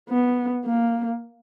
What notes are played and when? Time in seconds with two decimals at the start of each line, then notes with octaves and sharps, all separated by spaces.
0.09 B3
0.66 A#3